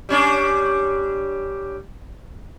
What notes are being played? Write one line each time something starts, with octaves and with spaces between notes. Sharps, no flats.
G3 C#4 D4